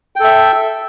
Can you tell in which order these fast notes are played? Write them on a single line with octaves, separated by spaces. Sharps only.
G5 A4 E5